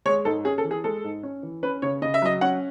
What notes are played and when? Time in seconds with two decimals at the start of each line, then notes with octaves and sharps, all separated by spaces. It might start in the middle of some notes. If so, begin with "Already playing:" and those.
0.05 G#3 C#5
0.25 G#2 A4
0.45 C#4 G#4
0.58 A4
0.64 E3
0.71 G#4
0.84 G#3 A4
1.04 G#2
1.23 C#4
1.43 E3
1.63 C#4 B4
1.82 C#3 C#5
2.02 C#3 D#5
2.14 E5
2.22 F#3 D#5
2.41 C#4 F#5